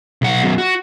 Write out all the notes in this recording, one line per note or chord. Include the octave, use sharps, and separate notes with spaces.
B1 F#5
F#2 B2
F#4